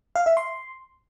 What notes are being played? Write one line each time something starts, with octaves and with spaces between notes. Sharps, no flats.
F5
E5
C6